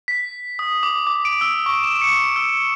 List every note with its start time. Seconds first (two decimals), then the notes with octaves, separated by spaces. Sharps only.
0.08 B6
0.59 D#6
0.83 D6
1.07 D6
1.25 D7
1.41 E6
1.66 C#6
1.84 E7
2.02 C#7
2.36 E6